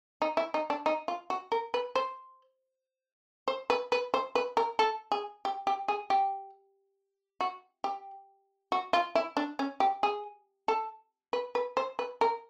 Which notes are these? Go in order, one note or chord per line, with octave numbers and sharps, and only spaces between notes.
D#4
E4
D#4
D4
D#4
F4
F#4
A#4
B4
C5
C5
B4
B4
C5
B4
A#4
A4
G#4
G4
G4
G#4
G4
F#4
G4
F#4
F4
E4
D4
C#4
G4
G#4
A4
B4
B4
C5
B4
A#4